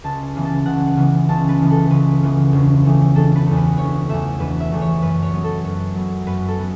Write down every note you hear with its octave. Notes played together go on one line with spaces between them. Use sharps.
C#2 A5
C#3 E3 B3
A5
C#2 F#5
C#3 E3 B3
C#2 A5
B4
C#3 E3 B3
A4
C#2 B4
C#3 E3 B3
E1
E2 E3 A3
E1 A4
B4
E2 E3 A3
B4
E1 C#5
E2 E3 A3 E5
E1 B4
E5
E2 E3 A3
C#5
F#2 B4
C#5
F#3 B3
A4
F#2
F#3 B3
F#2 B4
A4
F#3 B3